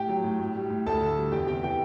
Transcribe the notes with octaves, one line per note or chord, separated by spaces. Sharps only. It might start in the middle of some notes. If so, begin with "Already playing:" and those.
Already playing: A2 G4 G5
F#3
A2
A2
G3
A2
D2 A4 A5
D3
G3
E2 G4 G5
C3 G4 G5
E3 G4 G5